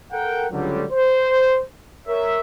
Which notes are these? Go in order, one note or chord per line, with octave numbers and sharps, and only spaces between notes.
A4 A#4 F#5 G5
C#2 D3 F#3 G3
C5
A#4 C#5 E5